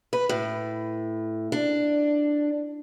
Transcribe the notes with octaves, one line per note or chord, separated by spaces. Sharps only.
B4
A2
D4